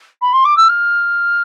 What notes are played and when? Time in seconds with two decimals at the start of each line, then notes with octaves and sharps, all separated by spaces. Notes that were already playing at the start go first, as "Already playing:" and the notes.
0.21 B5
0.33 C6
0.45 D6
0.57 E6
0.68 F6